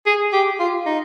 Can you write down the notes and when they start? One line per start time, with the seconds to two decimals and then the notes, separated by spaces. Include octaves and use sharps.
0.06 G#4
0.33 G4
0.59 F4
0.86 D#4